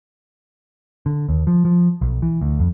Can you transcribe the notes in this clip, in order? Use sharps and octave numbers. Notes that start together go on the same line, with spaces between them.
D3
D#2
F3
F3
B1
E3
D2
F2